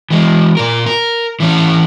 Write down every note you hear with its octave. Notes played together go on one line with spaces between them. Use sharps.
E3 G#3
A#2 A#4
A#4
E3 C#4